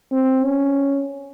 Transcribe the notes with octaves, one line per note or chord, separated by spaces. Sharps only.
C4
C#4